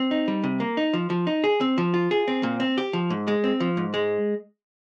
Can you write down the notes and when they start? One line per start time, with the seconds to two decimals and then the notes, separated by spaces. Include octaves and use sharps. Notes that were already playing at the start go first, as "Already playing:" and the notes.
Already playing: C4
0.11 D#4
0.28 G3
0.44 C3
0.60 A#3
0.77 D#4
0.93 F3
1.10 F3
1.27 D#4
1.44 G#4
1.61 C4
1.78 F3
1.94 F4
2.11 G#4
2.28 C4
2.43 A#2
2.60 C4
2.78 G4
2.93 F3
3.10 G#2
3.28 G#3
3.44 C4
3.60 F3
3.77 G#2
3.94 G#3